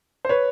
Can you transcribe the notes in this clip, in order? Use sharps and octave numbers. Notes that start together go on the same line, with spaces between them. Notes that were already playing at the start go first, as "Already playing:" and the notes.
C5
B4 C#5